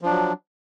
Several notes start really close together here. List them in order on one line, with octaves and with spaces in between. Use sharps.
F3 D4 F#3